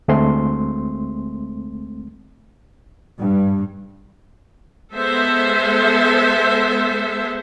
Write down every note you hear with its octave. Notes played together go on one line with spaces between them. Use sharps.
D2 G#3 A3 C4 C6
G2
G#3 B3 A4 C5 E5